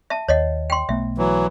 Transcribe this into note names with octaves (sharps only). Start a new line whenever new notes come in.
E5 A5
D#2 C#5 D#5 F#5
G5 C6
B1 A3 B3 E5
E3 F#3